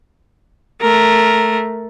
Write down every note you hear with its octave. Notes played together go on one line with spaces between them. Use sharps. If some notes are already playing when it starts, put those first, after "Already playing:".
A3 A#4